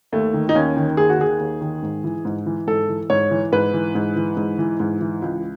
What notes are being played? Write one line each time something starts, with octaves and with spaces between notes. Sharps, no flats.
D#2 A3
D#3
D#4
D#2 C#4
D#3
D#2 G#4
F#4
D#3 G#4
D#2
D#3
G#2
E3
G#2
E3
G#2 A4
E3
G#2 C#5
E3
G#2 B4
E3
G#2
E3
G#2
E3
G#2
E3
C#2